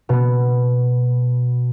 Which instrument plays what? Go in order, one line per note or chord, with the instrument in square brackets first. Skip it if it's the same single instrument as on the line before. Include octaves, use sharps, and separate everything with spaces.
[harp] B2 B3